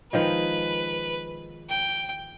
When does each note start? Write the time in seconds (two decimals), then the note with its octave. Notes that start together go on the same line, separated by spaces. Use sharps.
0.13 D#3 F3 G#3 B4
1.70 G5